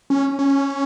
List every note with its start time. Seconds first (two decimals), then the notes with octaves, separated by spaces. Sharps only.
0.10 C#4
0.39 C#4